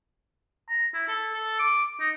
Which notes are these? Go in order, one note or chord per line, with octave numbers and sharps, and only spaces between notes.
A#5
E4
A4
A4
D6
D#4